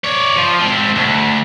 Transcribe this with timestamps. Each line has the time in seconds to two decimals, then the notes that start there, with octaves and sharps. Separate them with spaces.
0.04 C#5 D5
0.36 F3
0.60 G#3 C4
0.95 D2